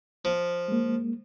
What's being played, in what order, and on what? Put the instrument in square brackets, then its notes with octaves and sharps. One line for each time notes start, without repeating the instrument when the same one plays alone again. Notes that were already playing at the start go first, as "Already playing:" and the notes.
[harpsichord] F3
[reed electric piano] G#3 A#3